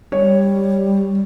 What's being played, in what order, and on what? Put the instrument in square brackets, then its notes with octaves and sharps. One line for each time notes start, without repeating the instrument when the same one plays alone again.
[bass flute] G3 [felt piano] C#5